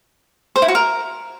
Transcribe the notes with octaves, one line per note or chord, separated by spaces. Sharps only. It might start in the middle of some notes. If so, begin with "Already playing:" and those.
C5
E4
F#4
A#4